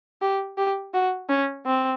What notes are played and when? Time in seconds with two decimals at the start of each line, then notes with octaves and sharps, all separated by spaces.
0.22 G4
0.58 G4
0.94 F#4
1.29 C#4
1.66 C4